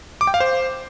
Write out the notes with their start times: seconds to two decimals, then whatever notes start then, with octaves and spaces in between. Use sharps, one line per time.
0.21 D6
0.27 G5
0.34 F5
0.40 C5